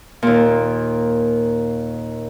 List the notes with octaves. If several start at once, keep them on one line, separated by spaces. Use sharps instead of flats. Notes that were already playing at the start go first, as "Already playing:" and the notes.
D#2 A#2